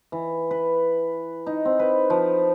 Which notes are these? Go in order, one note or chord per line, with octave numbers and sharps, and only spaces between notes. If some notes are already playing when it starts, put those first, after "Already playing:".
E3
B4
D#4
C4
B4
F3